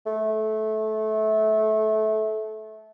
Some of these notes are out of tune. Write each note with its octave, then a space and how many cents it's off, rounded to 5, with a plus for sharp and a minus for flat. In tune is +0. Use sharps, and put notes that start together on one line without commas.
A3 -20